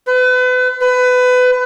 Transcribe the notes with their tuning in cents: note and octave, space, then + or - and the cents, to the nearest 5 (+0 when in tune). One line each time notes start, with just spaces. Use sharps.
B4 +35
B4 +25